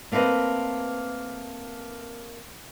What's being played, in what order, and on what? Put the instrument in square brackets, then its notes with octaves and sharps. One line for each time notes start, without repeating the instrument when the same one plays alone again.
[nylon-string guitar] A3 A#3 C4 B4 D#5